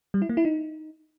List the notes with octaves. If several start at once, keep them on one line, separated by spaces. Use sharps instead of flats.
G3
E4
A#3
E4
D#4